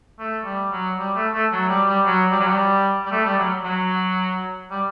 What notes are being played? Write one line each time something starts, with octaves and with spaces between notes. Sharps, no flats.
A3
G3
F#3
G3
A3
A3
F#3
G3
G3
F#3
G3
F#3
G3
G3
A3
G3
F#3
F#3
G3